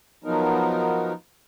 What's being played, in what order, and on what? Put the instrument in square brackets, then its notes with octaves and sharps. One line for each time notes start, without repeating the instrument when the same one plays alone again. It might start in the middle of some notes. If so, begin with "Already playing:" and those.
[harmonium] F3 F#3 B3 D#4 A#4